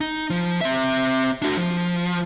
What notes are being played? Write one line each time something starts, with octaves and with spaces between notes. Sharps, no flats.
D#4
F3
C4 E5
D4 F#4
F3